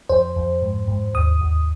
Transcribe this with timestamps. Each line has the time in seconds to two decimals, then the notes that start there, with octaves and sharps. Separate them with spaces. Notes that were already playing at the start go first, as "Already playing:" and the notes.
0.09 F2 C5
0.36 F2
0.62 G#2
0.88 G#2
1.14 D#2 D#6
1.41 D#2